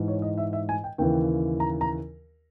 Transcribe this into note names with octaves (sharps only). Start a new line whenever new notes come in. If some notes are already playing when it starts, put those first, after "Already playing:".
Already playing: G#2 E3
C#5
D#5
E5
E5
G#5
G5
D#2 C#3 E3 G5
A#5
A#5